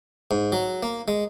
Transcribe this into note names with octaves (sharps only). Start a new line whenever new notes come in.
G#2
F#3
A#3
G#3